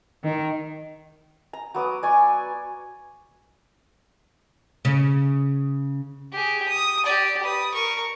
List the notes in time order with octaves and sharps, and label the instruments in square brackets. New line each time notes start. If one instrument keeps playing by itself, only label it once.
[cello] D#3
[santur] A#5
F#3 B3 D6 D#6
D5 G#5 C#6
[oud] C#3
[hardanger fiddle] G4 G#4
D#6
G4 D5
B4 D#6
A#4 C#6